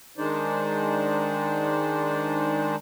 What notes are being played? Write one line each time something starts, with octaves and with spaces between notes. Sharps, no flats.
D#3 G#3 D4 D#4 C5 D5